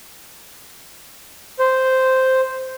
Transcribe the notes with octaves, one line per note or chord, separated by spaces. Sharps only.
C5